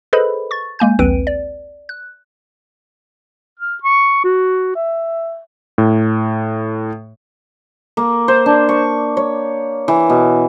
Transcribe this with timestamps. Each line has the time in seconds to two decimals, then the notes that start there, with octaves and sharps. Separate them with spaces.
0.13 G#4 A4 B4 C5 D#5 B5
0.51 C#6 A6
0.79 G#3 A#3 G#5 G6
0.99 A#1 D#2 C4 B4 D7 D#7
1.27 D5
1.89 F#6
3.59 F6
3.83 C#6
4.24 F#4
4.75 E5
5.78 A2
7.97 A#3
8.28 C5
8.46 D4
8.69 C#6
9.17 C#5
9.88 E3
10.10 B2